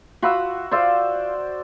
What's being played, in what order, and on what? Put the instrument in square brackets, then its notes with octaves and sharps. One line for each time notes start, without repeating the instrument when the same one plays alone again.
[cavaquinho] F4 F#5 B5 [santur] F#4 E5
[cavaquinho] F4 F5 [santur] C5 D5 E5